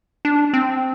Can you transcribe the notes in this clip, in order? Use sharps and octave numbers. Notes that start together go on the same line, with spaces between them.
D4
C4